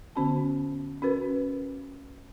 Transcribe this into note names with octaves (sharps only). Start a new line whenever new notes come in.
D3 B3 C#4 F#4 A5
C#4 F#4 A#4 B4